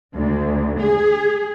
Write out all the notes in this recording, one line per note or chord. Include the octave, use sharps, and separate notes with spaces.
D2
G#4